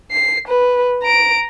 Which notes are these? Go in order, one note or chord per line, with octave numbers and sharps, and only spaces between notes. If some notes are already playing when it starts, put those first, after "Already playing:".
C7
B4
A#5 D7